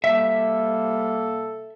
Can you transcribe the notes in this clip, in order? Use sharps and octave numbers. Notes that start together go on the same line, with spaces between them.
C3 G3 A#3 A4 E5